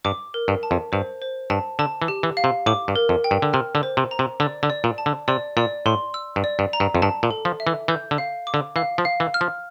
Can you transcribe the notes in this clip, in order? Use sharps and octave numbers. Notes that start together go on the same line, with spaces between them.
G2 D6
A#4
G2
A5
F2
G2 C5
C5
G2 A5
D3 A5
E3
G4
E3
F5
C3
A2 D6
G2
A#4
F2
G5
G2
D3
C3 F6
D3
C5
C3
A#5
C3
D3 D5
D3
D5
A#2
A5
D3
C3 D5
A#2 D5
A2 C6
E6
G2
D5
G2
A#5
G2
F2
G2 A5
A#2
A4
F3
E5
E3
E3 G6
D3
F5
D6
D3
E3 F5
F3
F5
E3
F6
F3